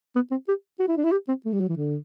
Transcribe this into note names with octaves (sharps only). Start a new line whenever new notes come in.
B3
C4
G4
F#4
E4
D4
E4
G4
C4
A3
G3
F#3
E3
D3